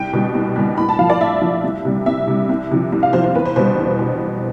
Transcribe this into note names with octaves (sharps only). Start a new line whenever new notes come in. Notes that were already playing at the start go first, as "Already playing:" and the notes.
Already playing: C2 G5
B2 G3
C2
B2 G3
A2 B5
A5
F3 F5
D5
A2 E5
F3
C2
C3 G3
C2 E5
C3 G3
C2
C3 F3
C2
F5
C3 F3 C5
C5
E2 B4
C5
B2 G3 C5
E2
B2